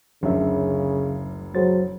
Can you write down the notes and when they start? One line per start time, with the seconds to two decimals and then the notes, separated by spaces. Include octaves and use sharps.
0.23 F#1 D2 C#3 F#3 C#4 E5
1.55 F#3 G#4 C5 A6